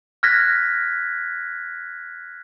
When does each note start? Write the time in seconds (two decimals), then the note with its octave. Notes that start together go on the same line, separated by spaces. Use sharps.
0.23 F6 F#6 G#6 A#6 B6